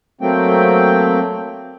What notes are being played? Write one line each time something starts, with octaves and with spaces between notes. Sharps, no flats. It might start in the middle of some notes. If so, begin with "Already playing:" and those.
F#3 A3 A#3 C4 G5